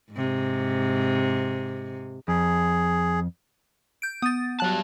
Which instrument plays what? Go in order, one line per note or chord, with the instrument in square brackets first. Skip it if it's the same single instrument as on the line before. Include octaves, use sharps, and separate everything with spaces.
[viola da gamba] G#2 C3
[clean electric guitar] F2 [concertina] G#4
[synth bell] G6 D7
[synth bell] B3 A6 [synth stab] D#6
[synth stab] F#3 F#6 [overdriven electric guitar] G3 A5